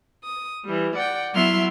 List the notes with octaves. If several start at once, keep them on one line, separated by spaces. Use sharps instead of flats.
D#6
E3 G3
D5 F#5 G5
F#3 B3 E4 E5 C6 F6